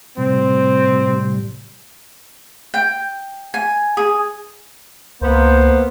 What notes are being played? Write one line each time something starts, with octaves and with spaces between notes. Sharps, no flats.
A2 C3 G3 C4
G5
G#5
G#4
C#2 A#3 B3 C5